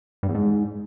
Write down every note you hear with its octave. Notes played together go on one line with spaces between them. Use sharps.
G2
E2
G#2